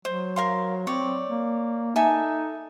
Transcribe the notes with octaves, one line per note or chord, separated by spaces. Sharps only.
F#3 C5
A#4 F5 C6
C4 C#5 D5
A#3
D#4 A4 E5 G#5